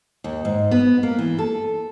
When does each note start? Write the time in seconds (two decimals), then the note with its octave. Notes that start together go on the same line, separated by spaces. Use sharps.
0.24 D#2
0.45 G#2
0.71 B3
1.03 A#3
1.18 E3
1.38 A4